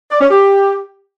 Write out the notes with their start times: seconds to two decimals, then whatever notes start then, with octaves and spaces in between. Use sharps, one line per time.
0.11 D5
0.21 C#4
0.30 G4